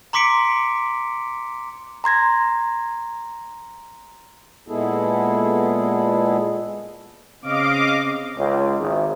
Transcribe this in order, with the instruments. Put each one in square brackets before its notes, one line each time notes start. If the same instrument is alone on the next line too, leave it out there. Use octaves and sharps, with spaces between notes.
[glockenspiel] A#5 C6 D6 B6 C#7 D7
[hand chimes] A#5 C6 G#6 A#6
[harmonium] A#2 G#3 B3 E4 G#4 A4
[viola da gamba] C#3 C4 [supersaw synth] D#5 F5 D6
[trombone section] C#2
G#1